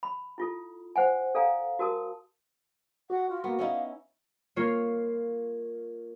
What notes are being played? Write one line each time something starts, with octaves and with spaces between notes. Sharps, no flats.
B5
E4 F4 A4
C5 F#5 G#5
A4 D5 F5 G#5 A#5
F#4 A#4 A5 D#6
F#4 F#5
F4
A#3 B3
C#4 D#4 E4 F5
A#3 F4 C#5